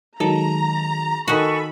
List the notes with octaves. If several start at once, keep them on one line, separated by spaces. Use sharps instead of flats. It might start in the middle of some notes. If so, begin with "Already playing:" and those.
D#3 F#3 G#3 A4 A#5
D#3 F#4 A4 G#5 B5 C#6